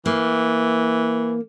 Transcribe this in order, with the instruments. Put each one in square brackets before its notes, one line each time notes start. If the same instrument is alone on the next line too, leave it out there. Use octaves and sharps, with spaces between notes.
[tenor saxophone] E3 [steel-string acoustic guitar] A#3